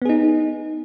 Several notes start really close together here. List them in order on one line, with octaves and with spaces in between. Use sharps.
B3 G#4 D#4